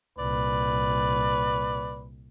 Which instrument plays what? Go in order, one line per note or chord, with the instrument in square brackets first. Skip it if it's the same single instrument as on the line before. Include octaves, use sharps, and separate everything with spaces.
[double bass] C2 A#2 [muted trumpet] B4 [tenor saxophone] D5